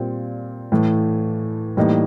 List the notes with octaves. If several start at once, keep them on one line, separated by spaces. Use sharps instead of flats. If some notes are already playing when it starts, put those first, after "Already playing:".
Already playing: A#2 G3 C4
A2 E3 A3
A2 E3 G3 A#3 D#4